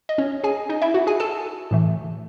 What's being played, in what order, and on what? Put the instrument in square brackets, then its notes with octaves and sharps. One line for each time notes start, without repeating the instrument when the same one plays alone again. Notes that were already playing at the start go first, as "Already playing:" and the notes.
[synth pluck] D#5
C#4 C#5
G#4 G#5
D#4 D#5
E4 E5
F#4 F#5
G#4 G#5
A4 A5
A2 E3 A3